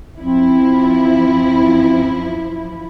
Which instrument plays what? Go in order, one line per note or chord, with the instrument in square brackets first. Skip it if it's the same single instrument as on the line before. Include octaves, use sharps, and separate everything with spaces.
[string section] F#2 F3 E4 [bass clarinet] C4